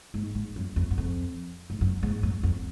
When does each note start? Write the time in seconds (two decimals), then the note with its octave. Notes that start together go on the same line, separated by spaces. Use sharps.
0.14 G#2
0.35 G#2
0.56 F#2
0.76 F2
0.91 F#2
0.98 F2
1.70 G#2
1.81 F#2
2.03 G#2
2.23 F#2
2.43 F2